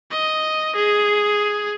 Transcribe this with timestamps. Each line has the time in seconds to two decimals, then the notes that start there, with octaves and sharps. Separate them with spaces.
0.11 D#5
0.76 G#4